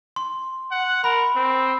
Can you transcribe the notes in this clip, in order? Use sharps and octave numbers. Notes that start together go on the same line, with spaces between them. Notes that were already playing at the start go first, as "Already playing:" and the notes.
C6
F#5
A#4 B5
C4